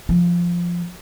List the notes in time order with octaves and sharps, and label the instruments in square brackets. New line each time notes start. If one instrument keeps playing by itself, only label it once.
[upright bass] F3